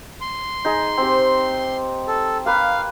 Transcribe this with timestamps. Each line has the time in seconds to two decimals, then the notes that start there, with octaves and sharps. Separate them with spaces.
0.21 C6
0.65 D#4 G#4
0.97 C4 G4
2.08 A4
2.46 A#3 B4 F5